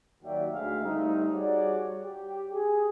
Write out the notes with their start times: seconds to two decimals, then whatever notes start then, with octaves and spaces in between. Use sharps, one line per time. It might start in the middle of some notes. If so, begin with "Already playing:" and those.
0.23 D#2 F#3 F#4 D5 E5 G5
0.53 D2 G#3 E5 F5
0.84 G3 A3 C4 D#4
1.32 G3 F#4 G#4 C#5 D5
2.04 G4
2.52 G#4